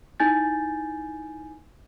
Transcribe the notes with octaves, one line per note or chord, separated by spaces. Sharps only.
D#4 E4 G#5 G6 A6